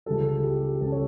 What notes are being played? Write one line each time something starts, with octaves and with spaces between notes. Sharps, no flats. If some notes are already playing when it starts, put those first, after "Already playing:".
C#2 C#3 G3 A4
G4
G4
C#2 C#3 G3 A4
C#5